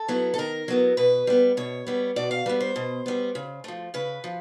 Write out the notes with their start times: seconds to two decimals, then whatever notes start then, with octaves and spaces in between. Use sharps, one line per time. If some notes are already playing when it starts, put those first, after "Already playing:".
Already playing: A4
0.08 F#3 B3 E4
0.34 A4
0.38 D#3 A#4
0.68 F#3 B3 E4
0.97 B2 B4
1.27 G3 B3
1.57 B2 C#5
1.87 G3 B3
2.16 B2 D5
2.31 F5
2.46 G3 B3 B4
2.60 C5
2.76 B2
3.06 G3 B3
3.35 C#3
3.64 F3 A3
3.94 C#3 B4
4.24 F3